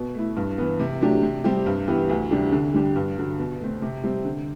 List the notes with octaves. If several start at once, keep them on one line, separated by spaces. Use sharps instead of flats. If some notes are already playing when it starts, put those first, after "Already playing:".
Already playing: B2
A3 E4
G2
E3 B3
C3
F#3 A3 D4 G4
C3
G3 C4 G4
G2
E3 B3 E4 G4
D2
C3 G3 D4 G4
D3
G3 D4 G4
G2
D3 F#3
B2
A3 C4
C3
G3 C4
D3